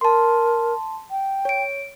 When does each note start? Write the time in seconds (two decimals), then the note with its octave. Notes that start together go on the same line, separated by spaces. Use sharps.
0.01 A#4 A5 C6
1.11 G5
1.45 C#5 D7